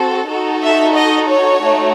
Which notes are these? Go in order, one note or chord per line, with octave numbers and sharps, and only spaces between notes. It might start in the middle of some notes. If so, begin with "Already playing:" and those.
Already playing: C4 F#4 A4
D#4 F#4 A4
E5
D#5
C#5
A3 D#4 F#4